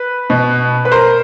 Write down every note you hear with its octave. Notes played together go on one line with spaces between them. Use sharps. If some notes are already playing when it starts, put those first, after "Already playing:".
Already playing: B4
B2
B4
A#4 C5